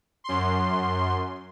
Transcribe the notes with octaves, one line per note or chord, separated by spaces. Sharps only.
F#2 C6